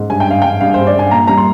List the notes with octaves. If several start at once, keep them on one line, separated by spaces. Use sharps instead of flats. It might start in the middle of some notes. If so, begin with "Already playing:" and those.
Already playing: G#2
G2 G#5
G5
G2 F5
G2 G5
G2 F5
C5
G2
D5
G2 G#5
A#2 A#5
G3 A#5
C6